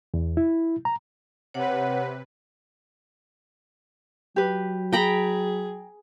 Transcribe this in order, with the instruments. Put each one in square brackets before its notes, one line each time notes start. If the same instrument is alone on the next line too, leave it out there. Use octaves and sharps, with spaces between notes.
[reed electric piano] E2
E4
A#5
[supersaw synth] C3 B4 [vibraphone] C#5 F#5
[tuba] F#3 [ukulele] G4 B4
[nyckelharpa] G#4 [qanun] G5 A#5 B5